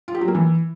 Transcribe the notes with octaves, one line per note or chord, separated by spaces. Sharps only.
F4
G4
F#3
A#3
E3